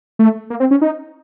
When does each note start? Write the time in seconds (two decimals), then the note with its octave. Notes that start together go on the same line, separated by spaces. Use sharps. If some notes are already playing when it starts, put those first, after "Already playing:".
0.19 A3
0.50 A#3
0.60 C4
0.71 C#4
0.81 D#4